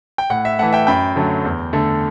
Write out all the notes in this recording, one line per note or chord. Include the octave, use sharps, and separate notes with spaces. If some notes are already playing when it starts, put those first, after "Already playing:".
G5
A2 F#5
E5
E3 A3 F#5
E5 G5
F#2 G5 B5
D3 F#3 A3
E2
D3 A3